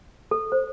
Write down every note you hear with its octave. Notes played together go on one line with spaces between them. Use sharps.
A4
C5